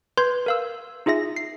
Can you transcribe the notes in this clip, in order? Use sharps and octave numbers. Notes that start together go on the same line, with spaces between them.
B4 C6 G6 G#6
A#4 F5 E6
D#4 F4 G#4 E5 A#6
C7